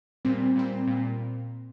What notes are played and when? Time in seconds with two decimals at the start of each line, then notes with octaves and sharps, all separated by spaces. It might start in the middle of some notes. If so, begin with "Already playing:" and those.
0.25 A#2 G3 C4
0.56 A#2 G3 C4
0.87 A#2 G3 C4